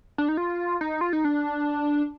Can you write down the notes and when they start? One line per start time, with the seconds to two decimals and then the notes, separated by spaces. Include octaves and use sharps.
0.18 D4
0.29 D#4
0.37 F4
0.81 D#4
1.01 F4
1.13 D#4
1.25 D4